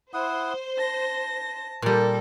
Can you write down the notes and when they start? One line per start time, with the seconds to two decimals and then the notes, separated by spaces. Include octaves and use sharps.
0.14 E4 C5 F#5 D#6
0.79 A5 A#6
1.82 A#2 G3 A4 A#4